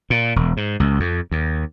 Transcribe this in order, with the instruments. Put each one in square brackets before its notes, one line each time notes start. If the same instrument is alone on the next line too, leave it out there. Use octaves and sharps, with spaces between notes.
[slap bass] A#2
E1
G#2
C#2
F2
D#2